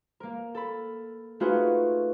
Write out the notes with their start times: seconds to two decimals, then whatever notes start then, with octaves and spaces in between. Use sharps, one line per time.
0.20 A#3 A#4
0.55 A4 B5
1.40 A3 D#4 F4 F#4 G#4 B4